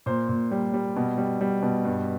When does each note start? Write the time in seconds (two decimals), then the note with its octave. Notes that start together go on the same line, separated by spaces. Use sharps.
0.06 A#2 C5
0.29 A#2
0.51 G3
0.73 G3
0.96 B2
1.18 G3
1.41 G3
1.62 B2
1.85 G2